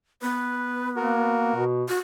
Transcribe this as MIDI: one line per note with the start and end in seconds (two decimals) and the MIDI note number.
0.22 1.54 59
0.22 0.89 71
0.96 1.53 58
0.96 1.64 66
0.96 1.64 70
1.55 1.84 47
1.89 1.97 66